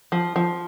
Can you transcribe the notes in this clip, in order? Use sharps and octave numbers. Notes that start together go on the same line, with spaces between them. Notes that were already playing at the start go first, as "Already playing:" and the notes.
F3
F3